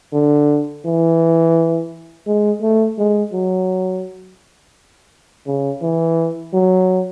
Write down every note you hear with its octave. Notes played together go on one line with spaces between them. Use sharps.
D3
E3
G#3
A3
G#3
F#3
C#3
E3
F#3